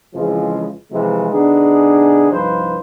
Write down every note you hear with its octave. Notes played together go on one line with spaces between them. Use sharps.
F2 C#3 E3 F3 G#3
C3 E3 F3 G#3
D3 B3 D4 D#4 G#4
C2 G2 F3 D#4 B4 C5